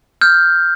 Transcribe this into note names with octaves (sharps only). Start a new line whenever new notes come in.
F6 G6